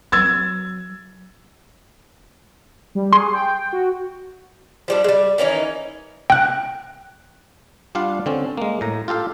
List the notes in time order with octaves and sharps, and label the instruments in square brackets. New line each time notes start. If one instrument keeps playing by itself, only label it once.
[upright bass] F#3 [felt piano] E6 G#6 A6
[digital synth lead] G3
[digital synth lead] G#4 [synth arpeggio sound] C6
[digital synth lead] G5
F#4
[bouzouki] F3 G3 D4
G3 G#3
D#3 E3 C#4 D#4
[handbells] G5 F#6
[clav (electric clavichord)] G3 D4 F4 F5 F#5
D3 C4 C#4
G#3 A#3
A2 A#5
F4 G4 A4 F5